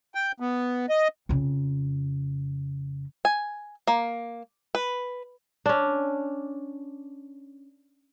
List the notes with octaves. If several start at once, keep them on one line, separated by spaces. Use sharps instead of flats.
G5
B3
D#5
F2 C#3
G#5
A#3
B4
C#4 D4